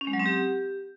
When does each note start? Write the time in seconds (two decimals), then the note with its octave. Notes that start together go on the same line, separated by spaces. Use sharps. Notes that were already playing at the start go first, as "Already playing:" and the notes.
0.01 C#4
0.07 G#3
0.13 F#3
0.19 C4
0.26 G4